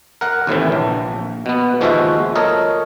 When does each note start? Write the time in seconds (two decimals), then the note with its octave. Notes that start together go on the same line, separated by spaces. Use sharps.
0.21 A#4 F#5
0.47 D#2 A2 C3 E3
0.72 A#1
1.46 B2 B3
1.81 D#2 F3 G#3 F4 F#4 E5
2.35 A4 A#4 C#5 D#5